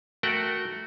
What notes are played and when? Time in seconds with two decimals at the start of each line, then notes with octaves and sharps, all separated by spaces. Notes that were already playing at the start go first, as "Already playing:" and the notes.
0.23 A3 F#4 A#4 F#5 G5